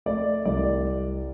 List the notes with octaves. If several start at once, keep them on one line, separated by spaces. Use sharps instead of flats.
A3 D5
C2 D5